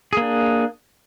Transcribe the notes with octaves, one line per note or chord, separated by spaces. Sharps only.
A#3 D4 G#4